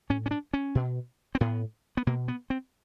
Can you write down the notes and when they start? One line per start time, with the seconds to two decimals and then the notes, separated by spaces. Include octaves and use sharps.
0.10 A2 C#4
0.26 C#4
0.31 D4
0.54 C#4
0.75 B2
1.35 C4
1.41 A2 B3
1.97 B3
2.07 B2 A#3
2.28 B3
2.50 C4